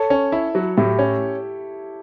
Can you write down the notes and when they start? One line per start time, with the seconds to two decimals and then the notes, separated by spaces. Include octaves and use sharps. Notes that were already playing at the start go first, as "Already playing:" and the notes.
Already playing: A4 C#5
0.10 C#4
0.32 E4
0.55 F#3
0.77 A2 E4 G4
0.99 C#4